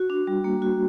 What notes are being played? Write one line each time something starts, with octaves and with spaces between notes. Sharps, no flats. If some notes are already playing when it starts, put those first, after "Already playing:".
Already playing: F#4
D4
G3
A#3
F#4